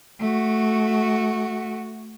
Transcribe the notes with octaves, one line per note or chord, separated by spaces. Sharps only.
A3 F#4